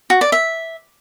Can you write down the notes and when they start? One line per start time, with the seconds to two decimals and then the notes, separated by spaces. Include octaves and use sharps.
0.10 F#4
0.21 D5
0.32 E5